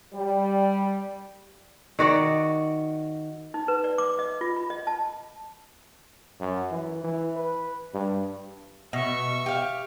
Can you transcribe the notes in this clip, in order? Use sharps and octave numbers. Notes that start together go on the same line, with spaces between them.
G3
D#3 F#4 D5
D#4
B4
D5
D6
D#5
F4
B5
D#5
A5
F#2
E3
E3
B4
G2
B2 E5 C#6
G4 F5